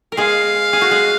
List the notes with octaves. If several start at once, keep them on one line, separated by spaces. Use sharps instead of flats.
A#4
G#3 G#4 F5
G#4
F#4
G#3 G#4